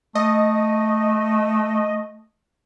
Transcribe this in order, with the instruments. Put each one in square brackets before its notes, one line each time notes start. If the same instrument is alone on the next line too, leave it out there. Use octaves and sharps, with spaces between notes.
[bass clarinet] A3 [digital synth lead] D#5